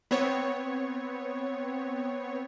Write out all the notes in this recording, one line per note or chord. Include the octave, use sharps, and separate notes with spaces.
B3 C4 C#5